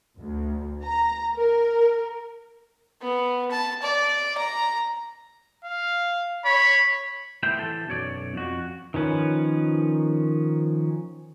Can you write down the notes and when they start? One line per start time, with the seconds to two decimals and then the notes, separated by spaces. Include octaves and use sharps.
0.19 D2
0.84 A#5
1.34 A#4
3.02 B3
3.51 A5
3.82 D5
4.38 A#5
5.64 F5
6.45 C#5 B5
7.43 A2 B3 C5 E5 G5
7.59 E3 A4
7.87 B1 F#2 C#5 D5
8.34 F2 F#4
8.94 D#3 F3 C#4 B4